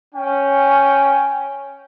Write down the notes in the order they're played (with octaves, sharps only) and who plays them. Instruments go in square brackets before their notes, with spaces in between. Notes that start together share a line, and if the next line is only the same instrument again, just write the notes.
[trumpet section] C#4 G5